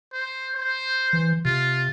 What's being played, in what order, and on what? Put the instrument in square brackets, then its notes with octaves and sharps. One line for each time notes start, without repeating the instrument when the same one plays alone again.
[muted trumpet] C5
C5
[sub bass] E3
[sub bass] C3 [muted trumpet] F4